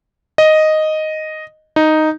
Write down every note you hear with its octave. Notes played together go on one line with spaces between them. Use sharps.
D#5
D#4